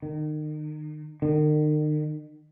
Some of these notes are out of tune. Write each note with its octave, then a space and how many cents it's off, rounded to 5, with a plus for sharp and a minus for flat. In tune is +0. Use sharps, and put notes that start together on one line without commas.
D#3 -35
D#3 -40